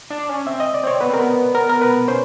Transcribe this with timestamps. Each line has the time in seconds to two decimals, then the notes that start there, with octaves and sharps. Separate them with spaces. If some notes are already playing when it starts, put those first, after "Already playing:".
0.10 D4
0.29 C#4
0.46 C4 E5
0.60 D#5
0.74 D5
0.83 C4 C#5
1.01 B3 B4
1.10 C4 A#4
1.19 B3
1.55 A#4
1.70 A#4
1.82 B4
2.08 C#4 C5